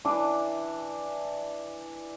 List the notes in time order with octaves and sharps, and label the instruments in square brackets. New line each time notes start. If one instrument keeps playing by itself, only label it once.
[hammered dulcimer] E3 D4 D6